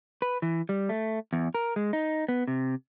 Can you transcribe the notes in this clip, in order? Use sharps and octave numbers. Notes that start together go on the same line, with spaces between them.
B4
E3
G3
A3
E2
A#4
G#3
D#4
B3
C3